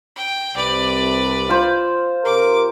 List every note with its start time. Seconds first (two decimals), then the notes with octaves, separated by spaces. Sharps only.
0.16 G5
0.56 C2 C3 B4 D5
1.49 F4 C5
2.25 C3 G4 A#4 D6